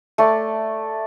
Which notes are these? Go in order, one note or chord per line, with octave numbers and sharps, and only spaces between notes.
A3 D5